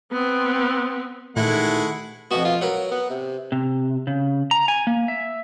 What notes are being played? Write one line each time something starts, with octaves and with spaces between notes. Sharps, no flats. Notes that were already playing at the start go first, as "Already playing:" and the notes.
B3 C4
A1 A#2 D#3 G#3 A3 E4 F#5
F2 B2 B3 F#4
F4
F#3 A#4 B4 F#5
B3
C3
C3
C#3
A#5
G#5
A#3
E5